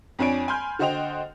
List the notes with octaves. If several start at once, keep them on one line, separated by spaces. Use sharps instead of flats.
F2 C4 D4 C#5 G#5 D7
G#5 B5 C6 F6 G6
D3 F#4 C5 D#5 G5 F7